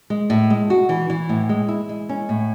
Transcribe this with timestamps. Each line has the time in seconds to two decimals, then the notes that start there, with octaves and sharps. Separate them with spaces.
0.10 G#3
0.30 A2
0.50 G#3
0.70 F#4
0.89 E3
1.10 E3
1.29 A2
1.49 G#3
1.68 E4
1.89 G#3
2.09 C#4
2.29 A2